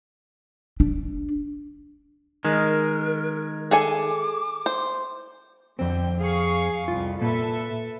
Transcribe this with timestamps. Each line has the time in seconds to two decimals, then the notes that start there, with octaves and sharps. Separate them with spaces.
0.80 D4
2.45 D#3 G#3 A#4
3.71 G#4 A4 G#5 D6
4.66 C5
5.79 F2 D3 C4 G5
6.19 G#4 F5 C#6
6.88 C2 F2 F4
7.22 A#2 A4 B4 E5